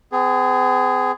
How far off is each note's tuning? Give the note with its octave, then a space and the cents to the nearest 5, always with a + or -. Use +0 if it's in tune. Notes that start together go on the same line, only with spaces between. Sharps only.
C4 -45 G#4 +0